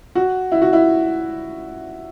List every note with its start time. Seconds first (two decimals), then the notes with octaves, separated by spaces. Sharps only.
0.15 F#4
0.52 E4
0.62 F#4
0.73 E4